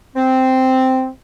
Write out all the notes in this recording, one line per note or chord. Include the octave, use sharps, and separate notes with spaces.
C4